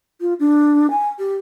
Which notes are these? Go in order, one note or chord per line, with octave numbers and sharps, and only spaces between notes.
F4
D4
G#5
G4